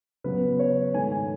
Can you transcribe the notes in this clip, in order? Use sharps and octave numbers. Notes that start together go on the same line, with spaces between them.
C#3 F#3 B3 B4
C#5
G#2 D#3 A3 G#5
G#5